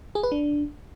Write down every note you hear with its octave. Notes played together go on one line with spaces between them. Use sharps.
G#4
B4
D4